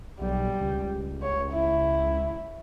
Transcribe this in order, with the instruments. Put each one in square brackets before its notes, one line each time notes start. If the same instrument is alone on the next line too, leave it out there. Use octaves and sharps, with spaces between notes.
[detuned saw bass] B1 [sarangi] G3
[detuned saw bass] C#2
[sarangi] C#5
E4